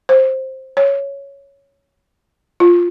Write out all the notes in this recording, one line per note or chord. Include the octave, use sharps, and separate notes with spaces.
C5
C#5
F4